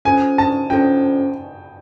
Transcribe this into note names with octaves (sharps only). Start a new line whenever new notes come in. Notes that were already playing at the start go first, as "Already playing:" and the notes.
C#4 F4 A4 C5 G#5
A5
C#4 F4 A4 C5 G5